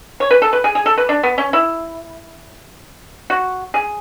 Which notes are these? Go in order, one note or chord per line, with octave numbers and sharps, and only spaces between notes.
C#5
B4
A4
B4
G#4
G#4
A4
B4
D4
B3
C#4
E4
F#4
G#4